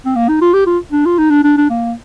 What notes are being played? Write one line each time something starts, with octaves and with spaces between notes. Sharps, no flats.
C4
A#3
D#4
F4
G4
F4
D4
F4
D#4
D4
D4
D4
A#3